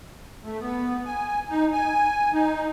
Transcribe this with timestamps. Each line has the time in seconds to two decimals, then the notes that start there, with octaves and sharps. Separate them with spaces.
0.44 A3
0.60 B3
1.05 G#5
1.49 D#4
1.73 G#5
2.33 D#4